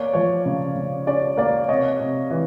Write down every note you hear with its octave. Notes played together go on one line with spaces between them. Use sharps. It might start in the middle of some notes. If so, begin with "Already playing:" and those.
Already playing: A#3 C#5 D5
F3 C#5
C#3
C#3
C#4 D5
A#3 D5
C3 C#5 D#5
C3
E3